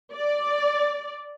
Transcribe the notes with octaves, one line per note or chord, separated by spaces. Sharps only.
D5